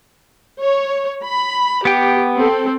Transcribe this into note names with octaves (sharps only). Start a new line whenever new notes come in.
C#5
B5
B3 G4 G5
C4 A4